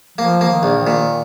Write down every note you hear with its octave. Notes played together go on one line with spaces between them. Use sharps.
F3 A#3
A#3
D#3
A#1
D#3
A#2